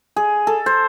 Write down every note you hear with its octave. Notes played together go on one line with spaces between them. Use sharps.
G#4
A4
C5